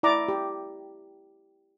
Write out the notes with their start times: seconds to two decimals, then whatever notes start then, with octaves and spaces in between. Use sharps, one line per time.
0.03 E4 D5 A#5 D6
0.28 G4